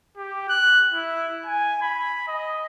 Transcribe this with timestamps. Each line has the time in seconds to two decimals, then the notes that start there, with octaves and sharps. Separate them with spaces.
0.17 G4
0.49 F#6
0.92 E4
1.46 G#5
1.82 B5
2.28 D#5